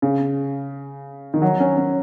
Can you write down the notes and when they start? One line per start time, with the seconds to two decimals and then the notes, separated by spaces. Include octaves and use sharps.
0.02 C#3
1.34 D#3
1.42 F#3
1.60 C#4
1.77 C#4